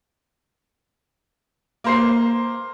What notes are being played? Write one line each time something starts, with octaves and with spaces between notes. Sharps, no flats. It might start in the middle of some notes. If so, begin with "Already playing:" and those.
A#3 C5 C7